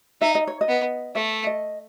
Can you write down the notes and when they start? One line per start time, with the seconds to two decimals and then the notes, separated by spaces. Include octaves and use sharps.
0.21 D#4 E5
0.35 D#5
0.47 C#5
0.61 D#5
0.68 B3
1.15 A3 E5
1.47 D#5